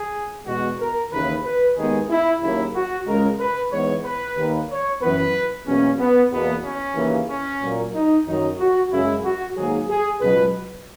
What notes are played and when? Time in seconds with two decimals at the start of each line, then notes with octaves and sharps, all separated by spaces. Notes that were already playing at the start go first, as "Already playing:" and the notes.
Already playing: G#4
0.46 E2 B2 G#3 B3 F#4
0.79 A#4
1.11 D#2 C#3 E3 B4
1.44 B4
1.76 D#2 D#3 G#3 B3 G#4
2.09 E4
2.41 D#2 C#3 F#3 A#3 E4
2.74 F#4
3.06 C#2 C#3 G#3 A#4
3.39 B4
3.71 G#2 E3 G#3 B3 C#5
4.04 B4
4.36 D#2 D#3 A#3
4.69 C#5
5.01 F#2 E3 B3 B4
5.66 E2 B2 F#3 A#3 C#4
5.99 B3
6.31 E2 B2 A#3 B3
6.64 C#4
6.96 D#2 C#3 E3 A#3
7.29 C#4
7.61 A#2 F#3 A#3
7.94 D#4
8.26 F#2 D#3 F#3 D#4
8.58 F#4
8.91 F#2 C#3 G#3 E4
9.23 F#4
9.56 G#2 D#3 F#3 A#3 G#4
9.89 G#4
10.21 C#2 B2 F#3 B4